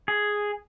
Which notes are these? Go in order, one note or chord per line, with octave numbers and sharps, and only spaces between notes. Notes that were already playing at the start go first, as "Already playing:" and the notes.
G#4